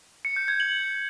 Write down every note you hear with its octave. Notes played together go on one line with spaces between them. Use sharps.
C#7
G6
G#6
F#7